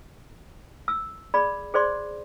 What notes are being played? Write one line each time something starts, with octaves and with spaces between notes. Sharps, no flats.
E6
G#4 D5 B5
G#4 C5 D5 C6